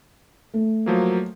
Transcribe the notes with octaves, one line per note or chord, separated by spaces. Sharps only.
A3
F3 F#3 A#3